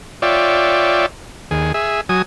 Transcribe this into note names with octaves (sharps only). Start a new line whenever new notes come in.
F4 C#5 D5 E5 G5
D#2 G#4
G#4 E5
F#3 G#5 D#6